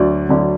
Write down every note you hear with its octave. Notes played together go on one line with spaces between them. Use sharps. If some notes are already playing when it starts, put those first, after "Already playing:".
Already playing: D2 D3 F#3 D5
D2 D3 F#3